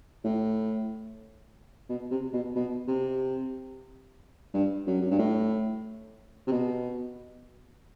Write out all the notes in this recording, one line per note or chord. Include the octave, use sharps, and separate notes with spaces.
A2
B2
C3
B2
B2
C3
G2
F#2
F#2
G2
A2
C3
B2